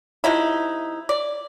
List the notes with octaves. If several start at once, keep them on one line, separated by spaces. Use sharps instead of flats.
C3 F3 D#4 E4
D5